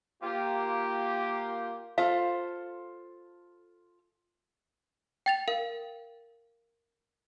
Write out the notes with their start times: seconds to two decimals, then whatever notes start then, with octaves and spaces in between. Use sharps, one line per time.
0.23 A#3 F4 G4
1.98 F4 A4 C5 F5
5.26 G5 A6 F7
5.48 A#4 F5